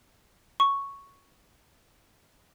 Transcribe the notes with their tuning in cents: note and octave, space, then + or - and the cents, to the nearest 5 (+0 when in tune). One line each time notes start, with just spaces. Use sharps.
C#6 +0